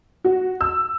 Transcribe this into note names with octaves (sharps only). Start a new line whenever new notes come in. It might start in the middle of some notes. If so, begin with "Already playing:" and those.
F#4
E6